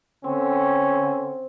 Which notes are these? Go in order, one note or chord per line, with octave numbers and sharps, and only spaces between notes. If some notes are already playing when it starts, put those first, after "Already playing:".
D3 C4 C#4